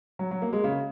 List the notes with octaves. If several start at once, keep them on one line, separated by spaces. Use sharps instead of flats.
F#3
F#3
A#3
G#3
C#3